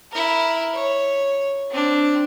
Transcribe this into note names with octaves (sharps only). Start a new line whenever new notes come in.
E4 A#4
C#5
C4 D4